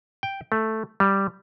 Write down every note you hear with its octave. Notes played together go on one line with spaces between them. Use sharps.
G5
A3
G3